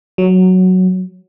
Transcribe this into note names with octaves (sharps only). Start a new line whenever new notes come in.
F#3